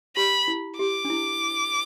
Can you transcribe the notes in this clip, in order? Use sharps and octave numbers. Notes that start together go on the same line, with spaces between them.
G4 B5
E4
G4 D6
D4
E4